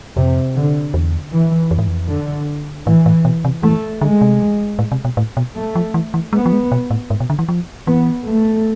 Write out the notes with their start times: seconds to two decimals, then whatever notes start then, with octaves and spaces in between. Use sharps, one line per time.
0.17 F2 C3
0.55 D3
0.94 E2
1.33 E3
1.71 F2
1.79 G#2
1.88 F2
2.09 D3
2.87 A2 E3
3.06 A2
3.25 B2
3.45 C3
3.63 E3 A3
4.01 D3 G#3
4.21 C3
4.79 A2
4.92 C3
5.05 B2
5.17 A2
5.37 B2
5.56 A3
5.75 F3
5.94 E3
6.14 E3
6.33 G#3 B3
6.46 F3
6.53 G#3
6.72 B2
6.91 A2
7.10 G#2
7.20 B2
7.30 D3
7.39 E3
7.49 F3
7.87 E3 B3
8.25 A3